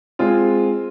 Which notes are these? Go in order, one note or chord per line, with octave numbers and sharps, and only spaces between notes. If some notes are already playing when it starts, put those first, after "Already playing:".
G#3 C4 F4 G#4